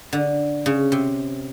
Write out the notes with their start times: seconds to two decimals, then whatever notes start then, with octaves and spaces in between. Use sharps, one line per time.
0.13 D3
0.66 C#3
0.92 C3